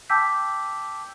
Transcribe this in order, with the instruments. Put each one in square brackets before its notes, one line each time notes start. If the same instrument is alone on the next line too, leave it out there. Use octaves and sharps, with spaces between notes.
[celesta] G5 A5 D6 E6 G6 B6